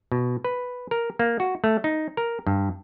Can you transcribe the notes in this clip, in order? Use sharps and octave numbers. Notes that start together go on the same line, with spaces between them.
B2
B4
A#4
A#3
F#4
A3
D#4
A#4
G2